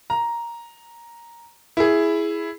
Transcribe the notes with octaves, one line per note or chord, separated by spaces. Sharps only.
A#5
E4 G#4